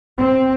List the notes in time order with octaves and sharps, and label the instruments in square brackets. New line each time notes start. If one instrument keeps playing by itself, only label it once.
[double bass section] C4